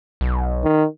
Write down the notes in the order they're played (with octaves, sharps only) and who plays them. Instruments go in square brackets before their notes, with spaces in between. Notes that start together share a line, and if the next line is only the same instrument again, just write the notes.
[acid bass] B1
[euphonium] D#3